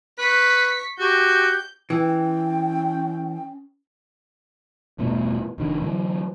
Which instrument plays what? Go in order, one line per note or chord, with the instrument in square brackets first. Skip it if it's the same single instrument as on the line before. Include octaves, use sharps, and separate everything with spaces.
[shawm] B4 [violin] C#6 B6
[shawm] F#4 [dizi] G4 [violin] G6
[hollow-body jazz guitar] E3 [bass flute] C#4 [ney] G5
[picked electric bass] E1 G2 B2 A3
F1 D#3 D4
D3 E3 F#3